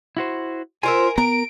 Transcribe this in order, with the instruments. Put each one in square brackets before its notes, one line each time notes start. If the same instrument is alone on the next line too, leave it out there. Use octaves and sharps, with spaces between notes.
[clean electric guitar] E4 F#4 C5
[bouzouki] F4 C5 E5 [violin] A#4 [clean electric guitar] G#5
[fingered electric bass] B3 [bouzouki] A#4 [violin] D7